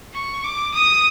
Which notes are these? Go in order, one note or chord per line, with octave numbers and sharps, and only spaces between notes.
C#6
D6
D#6